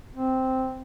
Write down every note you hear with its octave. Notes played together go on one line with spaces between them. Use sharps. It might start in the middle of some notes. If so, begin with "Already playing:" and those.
C4